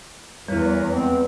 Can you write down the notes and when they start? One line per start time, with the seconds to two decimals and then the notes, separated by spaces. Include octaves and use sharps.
0.48 E2 G3 E4 A#4 B4 C#5
0.89 G#3 B3 C4